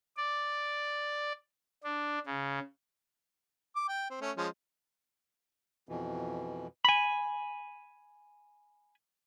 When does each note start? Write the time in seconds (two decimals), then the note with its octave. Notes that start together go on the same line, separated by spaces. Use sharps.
0.17 D5
1.84 D4
2.26 C#3
3.76 D6
3.88 G5
4.10 C4
4.21 A3 C#4
4.37 F3 G#3 C#4
5.89 F2 B2 E3
6.85 G#5 B5